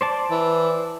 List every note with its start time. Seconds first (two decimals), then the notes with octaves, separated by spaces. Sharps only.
0.01 C5 D5 A5
0.31 E3